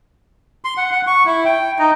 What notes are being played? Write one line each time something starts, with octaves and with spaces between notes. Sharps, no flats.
C6
F#5
F#5
C#6
E4
G5
D#4